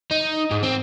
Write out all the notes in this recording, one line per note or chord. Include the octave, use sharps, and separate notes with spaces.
D#4
G#2
C4